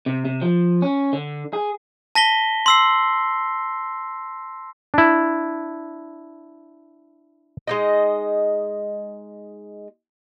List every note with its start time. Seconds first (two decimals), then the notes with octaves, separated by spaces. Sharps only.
0.06 C3
0.25 C3
0.42 F3
0.82 C#4
1.13 D3
1.53 G#4
2.15 A5 A#6 B6 G7
2.66 C6 E6 C7
4.94 D4 E4
7.67 G#3 D#4 D#5